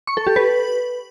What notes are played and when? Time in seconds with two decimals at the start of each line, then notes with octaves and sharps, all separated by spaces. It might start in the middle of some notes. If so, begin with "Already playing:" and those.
0.07 C#6
0.17 A4
0.27 G4
0.36 B4